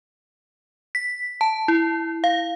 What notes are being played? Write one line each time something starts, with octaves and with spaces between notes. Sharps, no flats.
B6
A5
E4
F5